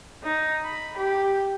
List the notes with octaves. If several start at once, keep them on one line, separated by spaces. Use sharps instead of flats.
D#4
B5
G4